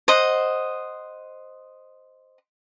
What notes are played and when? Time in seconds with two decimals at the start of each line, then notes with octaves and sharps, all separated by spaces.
0.08 C5 D#5 F#5